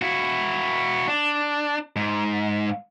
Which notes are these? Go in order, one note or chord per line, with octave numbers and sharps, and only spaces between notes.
E4 F#4
D4
G#2